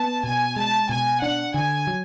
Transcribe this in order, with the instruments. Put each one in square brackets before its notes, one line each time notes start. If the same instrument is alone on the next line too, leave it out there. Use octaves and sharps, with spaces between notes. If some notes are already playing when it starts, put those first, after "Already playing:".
Already playing: [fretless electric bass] B3 [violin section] A5
[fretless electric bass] B2 [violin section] G#5
[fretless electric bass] G#3 [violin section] A5
[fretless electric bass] B2 [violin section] G#5
[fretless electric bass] D4 [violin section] F#5
[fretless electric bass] D3 [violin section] G#5
[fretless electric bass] F#3